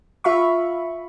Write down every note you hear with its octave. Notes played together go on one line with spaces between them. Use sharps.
F4 E5 F5 B5 C#6